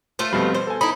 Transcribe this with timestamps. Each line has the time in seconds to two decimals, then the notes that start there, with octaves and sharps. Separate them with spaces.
0.19 A3 F4 C5
0.33 F2 B2 G3 B4
0.54 C5
0.67 A4 G#5
0.81 D#4 E4 B5